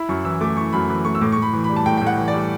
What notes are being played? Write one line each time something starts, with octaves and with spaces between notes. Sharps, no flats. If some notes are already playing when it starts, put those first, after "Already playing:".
Already playing: E4 B5
F#2 C#6
E3 E6
A3 D6
E4 C#6
F#2 B5
E3 B5
A3 C#6
E6
A2 D6
C#6
A2 B5
E3
G3 B5
A5
A2 G5
A2 G5
F#5
E3
D5
G3